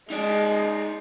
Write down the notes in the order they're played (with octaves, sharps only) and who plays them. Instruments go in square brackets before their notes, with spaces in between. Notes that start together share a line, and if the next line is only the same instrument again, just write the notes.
[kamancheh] G#3 [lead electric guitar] D#4 D5